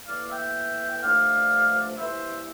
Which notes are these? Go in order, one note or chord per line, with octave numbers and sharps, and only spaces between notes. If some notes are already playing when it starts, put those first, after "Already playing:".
A2 E3 A#3 D5 F5
E5 G5
G5
G2 D3 F3 A3 D5 F5
G2 E3 A#3 C5 E5